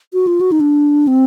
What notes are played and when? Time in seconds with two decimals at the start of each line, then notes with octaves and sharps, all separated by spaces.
0.14 F#4
0.27 F4
0.41 F#4
0.52 D#4
0.61 D4
1.07 C4